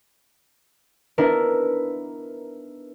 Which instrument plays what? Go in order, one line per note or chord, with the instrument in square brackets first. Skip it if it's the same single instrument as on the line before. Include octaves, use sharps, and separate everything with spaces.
[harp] B3 D4 E4 A#4